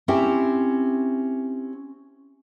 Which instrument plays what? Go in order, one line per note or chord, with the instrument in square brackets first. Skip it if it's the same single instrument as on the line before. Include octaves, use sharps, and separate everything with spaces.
[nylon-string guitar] C4 C#4 E4 G4 E5